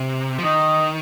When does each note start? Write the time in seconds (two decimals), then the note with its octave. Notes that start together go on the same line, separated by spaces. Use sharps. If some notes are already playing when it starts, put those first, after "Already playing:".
Already playing: C3
0.39 F3
0.44 D#3 D#5